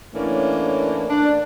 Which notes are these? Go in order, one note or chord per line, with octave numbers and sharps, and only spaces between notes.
A2 E3 A#3 C#4 D4
D4